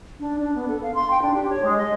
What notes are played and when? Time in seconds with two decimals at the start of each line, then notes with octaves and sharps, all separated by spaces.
0.20 D4
0.39 D4
0.55 B3
0.68 A4
0.82 F5
0.94 C6
1.10 G5
1.22 D4
1.34 G4
1.49 C#5
1.63 G#3
1.78 D#5